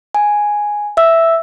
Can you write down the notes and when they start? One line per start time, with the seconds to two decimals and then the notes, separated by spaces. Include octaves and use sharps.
0.15 G#5
0.97 E5 E6